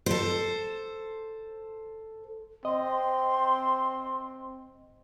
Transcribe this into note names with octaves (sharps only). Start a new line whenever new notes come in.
A4 C5
C4 D#5 C6